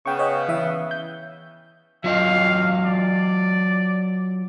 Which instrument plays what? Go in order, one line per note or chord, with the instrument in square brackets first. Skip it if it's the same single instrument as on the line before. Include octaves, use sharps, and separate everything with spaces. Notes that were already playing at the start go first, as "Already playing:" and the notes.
[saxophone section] C#3 B3 [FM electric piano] G5 C#6
[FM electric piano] C#5 D#5 G5
E3 E5
G6
[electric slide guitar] F#3 F4 D#5 [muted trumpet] F5
[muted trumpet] D5